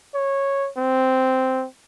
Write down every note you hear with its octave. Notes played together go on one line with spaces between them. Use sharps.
C#5
C4